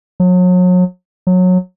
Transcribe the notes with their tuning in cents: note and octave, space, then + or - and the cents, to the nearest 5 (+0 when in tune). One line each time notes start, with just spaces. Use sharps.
F#3 -35
F#3 -20